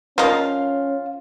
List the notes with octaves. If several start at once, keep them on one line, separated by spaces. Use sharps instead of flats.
F3 A#3 C#4 F4 D#5 F5